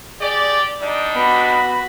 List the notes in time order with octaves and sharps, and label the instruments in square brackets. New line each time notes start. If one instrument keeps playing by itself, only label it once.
[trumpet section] G4 D5 [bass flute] G#4
[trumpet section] G3 D4 D#4 [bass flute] D5
[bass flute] B3 [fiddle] F#4 B5